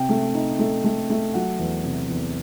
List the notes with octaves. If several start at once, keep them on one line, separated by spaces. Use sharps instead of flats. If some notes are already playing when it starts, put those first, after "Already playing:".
Already playing: C3 G5
A3
D#4
A3
A3
A3
F#3 F#5
E2
C3
E2